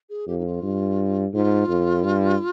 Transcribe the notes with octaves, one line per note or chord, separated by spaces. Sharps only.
G#4
F2 G4
D#4
F4
G2
G#2 F4
F2
G2